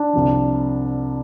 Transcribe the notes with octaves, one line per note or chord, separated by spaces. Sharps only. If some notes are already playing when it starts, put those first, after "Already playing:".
Already playing: D4
C2 C3 F3